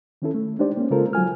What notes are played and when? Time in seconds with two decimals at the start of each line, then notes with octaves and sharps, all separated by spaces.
0.22 D#3 C#4 E4 A4
0.35 A3
0.59 G#3 D4 D#4 G4 C5 D5
0.77 A#3 C#4
0.90 C#3 G#3 F4 A4 A#4 C5
1.13 F#3 F4 G#5 F6